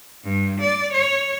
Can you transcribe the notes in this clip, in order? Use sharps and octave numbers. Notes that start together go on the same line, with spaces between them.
G2
D5
C#5